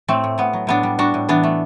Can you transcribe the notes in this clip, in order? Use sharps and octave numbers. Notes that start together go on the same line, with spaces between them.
A2 A3 C4
A2
A2 B3
F#3
A2 B3 D4
G3
G3 D4 F#4
A2
E3 B3 D4
A3